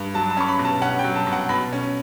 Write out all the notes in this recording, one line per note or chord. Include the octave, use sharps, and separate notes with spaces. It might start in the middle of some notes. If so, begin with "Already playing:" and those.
Already playing: G2
F#3 A5
A5
C#4 C#6
B5
B2
A5
C#4 F#5
F#3 G5
A5
B2
F#5
B2 B5
C#4